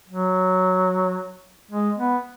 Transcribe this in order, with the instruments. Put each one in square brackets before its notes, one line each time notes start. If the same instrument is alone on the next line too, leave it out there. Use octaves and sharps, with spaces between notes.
[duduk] F#3
G#3
B3